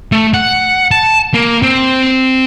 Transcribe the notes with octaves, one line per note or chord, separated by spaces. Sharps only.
A3
F#5
A5
A#3
C4